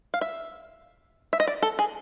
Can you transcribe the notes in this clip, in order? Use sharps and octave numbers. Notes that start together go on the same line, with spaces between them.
F5
E5
E5
D#5
D5
A4
G#4